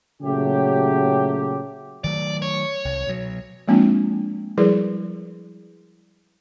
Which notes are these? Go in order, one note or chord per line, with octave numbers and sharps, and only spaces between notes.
A#2 C#3 F#3 A3 G4
D#3 F#3 A3 D5
C#5
C2
B2 F#3
F3 G#3 A#3 C4 D4 F4
F3 G3 E4 G#4 A#4 B4